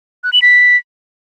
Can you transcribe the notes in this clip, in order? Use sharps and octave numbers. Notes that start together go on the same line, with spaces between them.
F#6
F#7
B6